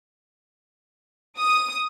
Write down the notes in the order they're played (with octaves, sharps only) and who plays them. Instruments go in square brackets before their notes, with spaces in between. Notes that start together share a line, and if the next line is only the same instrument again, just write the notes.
[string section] D#6